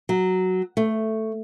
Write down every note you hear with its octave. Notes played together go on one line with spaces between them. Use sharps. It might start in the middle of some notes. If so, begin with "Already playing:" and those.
F#3
A3